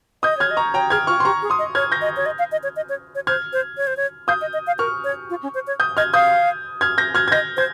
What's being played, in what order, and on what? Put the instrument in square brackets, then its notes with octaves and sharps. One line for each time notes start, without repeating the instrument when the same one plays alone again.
[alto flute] D#5 [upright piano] D#6 G6
[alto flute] C#5 [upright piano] F6 G#6
[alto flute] D#5
[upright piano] A#5 C#6
[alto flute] C#5 [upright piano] G5 A#5
[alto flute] G#4 [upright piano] F6 G#6
[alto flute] F4 [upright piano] C#6 F6
[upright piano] C6
[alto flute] G4 [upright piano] A#5 C#6
[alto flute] G#4
[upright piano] C6 D#6
[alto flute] D#5
[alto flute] C#5 [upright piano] F6 G#6
[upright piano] G6 A#6
[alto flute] D#5
C#5
D#5
F5
D#5
C#5
D#5
C#5
C#5
[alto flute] C5 [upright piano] F6 G#6
[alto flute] C5
C#5
C5
C#5
[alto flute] F5 [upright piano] D#6 G6
[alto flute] D#5
D#5
F5
[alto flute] A#4 [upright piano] C#6 F6
[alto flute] C#5
F4
C#4
C5
C#5
[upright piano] D#6 G6
[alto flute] D#5 [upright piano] F6 G#6
[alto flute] F5 [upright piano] D#6 G6
[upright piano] F6 G#6
G6 A#6
F6 G#6
G#6
[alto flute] D#5 [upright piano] G6 A#6
[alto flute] C5 [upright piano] G#6